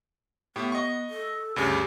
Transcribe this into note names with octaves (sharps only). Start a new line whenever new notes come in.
A2 B3 G4
D#5 C#6
A4
D2 G2 C#3 G4